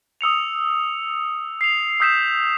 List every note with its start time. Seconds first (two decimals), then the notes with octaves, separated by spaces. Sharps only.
0.21 D#6 E6 C#7 F7
1.61 C7 F7
2.00 D#6 E6 G6 B6 C7 E7